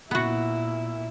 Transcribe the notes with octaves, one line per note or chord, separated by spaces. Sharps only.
A#2 B3 E4 F#4